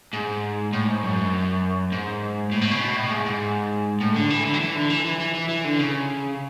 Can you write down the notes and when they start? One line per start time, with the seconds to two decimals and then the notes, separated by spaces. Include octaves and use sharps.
0.13 G#2
0.73 A2
0.88 G#2
1.03 F#2
1.92 G#2
2.52 A2
2.61 B2
2.71 C#3
2.81 B2
2.96 A2
3.11 G#2
3.26 G#2
4.01 A2
4.16 D3
4.30 E3
4.45 D3
4.54 F#3
4.60 E3
4.75 D3
4.90 E3
5.05 E3
5.20 E3
5.35 E3
5.49 E3
5.64 D3
5.79 C#3